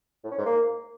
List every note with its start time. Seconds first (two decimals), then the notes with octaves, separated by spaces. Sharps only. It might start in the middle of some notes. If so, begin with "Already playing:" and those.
0.24 A2
0.31 C#4
0.39 G#2
0.46 A#3